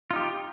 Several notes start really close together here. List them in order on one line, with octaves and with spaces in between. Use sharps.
F4 D#4 G4